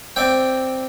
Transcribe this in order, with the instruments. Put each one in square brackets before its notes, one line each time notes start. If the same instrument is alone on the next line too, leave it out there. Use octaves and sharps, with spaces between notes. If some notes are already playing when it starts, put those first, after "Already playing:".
[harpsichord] C4 D5 E5 G5